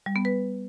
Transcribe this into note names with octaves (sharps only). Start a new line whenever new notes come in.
G3
B3
B4